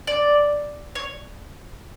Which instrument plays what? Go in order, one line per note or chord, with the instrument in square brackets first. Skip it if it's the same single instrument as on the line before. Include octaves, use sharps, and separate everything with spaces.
[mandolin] D5
C#5